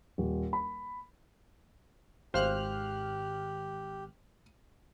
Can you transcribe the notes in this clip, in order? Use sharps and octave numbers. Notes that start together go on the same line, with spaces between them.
D#1
B5
G#1 G4 C5 F5 F6 F#6